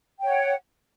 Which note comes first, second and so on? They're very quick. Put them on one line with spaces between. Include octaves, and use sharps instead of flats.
G5 C#5 F#5